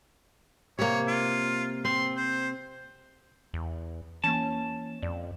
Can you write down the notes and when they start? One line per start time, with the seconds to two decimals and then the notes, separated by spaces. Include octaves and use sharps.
0.79 C3 A#3 C#5
1.08 F4
1.85 C4 C6
2.17 C5
3.54 E2
4.24 E3 A#3 C#4 A5
5.03 F2 D5